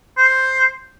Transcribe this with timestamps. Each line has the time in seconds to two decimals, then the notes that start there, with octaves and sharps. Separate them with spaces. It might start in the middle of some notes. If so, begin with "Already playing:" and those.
0.18 C5